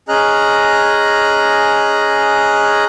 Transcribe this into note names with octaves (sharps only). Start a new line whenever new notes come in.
C#4 G#4 D#5 A#5 F6 F#6